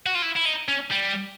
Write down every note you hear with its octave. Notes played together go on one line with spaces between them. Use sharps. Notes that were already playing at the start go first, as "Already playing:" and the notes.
F#4
F4
E4
E4
D#4
C#4
G3